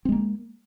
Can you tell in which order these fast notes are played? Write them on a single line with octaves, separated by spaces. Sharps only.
C4 G#3 A#3